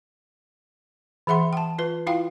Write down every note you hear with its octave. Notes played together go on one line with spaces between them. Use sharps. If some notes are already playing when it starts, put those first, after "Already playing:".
E3 G#4 E5 F#5 C6
G5 A5
F4 B4
E4 F4 F5 G5